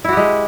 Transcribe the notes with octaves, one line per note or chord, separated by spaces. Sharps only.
G#3 E4 F#4 G4